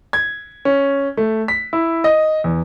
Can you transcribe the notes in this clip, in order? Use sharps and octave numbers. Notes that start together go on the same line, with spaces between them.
G#6
C#4
A3
B6
E4
D#5
E2